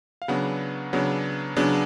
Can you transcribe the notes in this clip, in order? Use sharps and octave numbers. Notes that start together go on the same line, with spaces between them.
F5
C#3 F#3 B3 D4 F#5
C#3 F#3 B3 D4
C#3 F#3 B3 D4